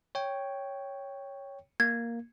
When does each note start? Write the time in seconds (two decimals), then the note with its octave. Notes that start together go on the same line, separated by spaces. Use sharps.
0.15 C#5 G5
1.80 A#3 G#6